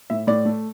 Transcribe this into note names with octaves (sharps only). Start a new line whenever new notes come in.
A2 E5
A2 D5
A3